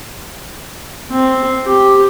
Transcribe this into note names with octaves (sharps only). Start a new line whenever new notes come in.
C4
G4